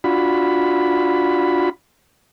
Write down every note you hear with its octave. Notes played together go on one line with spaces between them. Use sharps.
D4 F4 F#4 B5